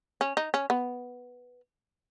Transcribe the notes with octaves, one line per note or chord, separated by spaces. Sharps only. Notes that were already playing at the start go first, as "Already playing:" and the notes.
C#4
D#4
C#4
B3